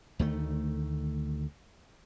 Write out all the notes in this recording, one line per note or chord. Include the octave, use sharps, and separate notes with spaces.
D2 D#3 A3